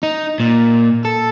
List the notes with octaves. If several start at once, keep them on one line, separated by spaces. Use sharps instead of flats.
D#4
A#2
A4